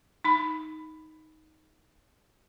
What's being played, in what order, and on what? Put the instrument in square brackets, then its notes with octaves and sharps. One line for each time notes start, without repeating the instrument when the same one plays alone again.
[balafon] D#4 B5